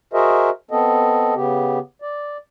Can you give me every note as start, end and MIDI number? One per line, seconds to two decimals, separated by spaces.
0.13 0.50 66
0.13 0.50 68
0.13 0.50 70
0.13 0.50 72
0.13 0.50 75
0.13 0.50 76
0.71 1.34 59
0.71 1.34 60
0.71 1.34 69
0.71 1.34 75
1.35 1.79 49
1.35 1.79 59
1.35 1.79 67
2.02 2.37 74